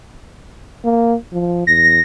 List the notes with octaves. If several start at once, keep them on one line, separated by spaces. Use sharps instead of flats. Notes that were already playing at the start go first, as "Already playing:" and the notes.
A#3
F3
E2 A#6